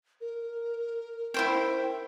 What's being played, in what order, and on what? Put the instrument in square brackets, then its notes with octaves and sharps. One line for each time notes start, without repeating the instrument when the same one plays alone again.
[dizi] A#4
[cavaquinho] E4 C5 G5